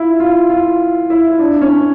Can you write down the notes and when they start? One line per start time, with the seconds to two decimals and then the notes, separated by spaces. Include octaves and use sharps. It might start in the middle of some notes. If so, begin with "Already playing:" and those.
Already playing: E4 F4
0.20 F4
0.50 F4
1.10 E4
1.39 D4
1.61 C#4